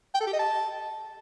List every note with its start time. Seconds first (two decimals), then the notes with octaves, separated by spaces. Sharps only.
0.14 G5
0.21 A4
0.27 G4
0.33 D#5
0.39 A5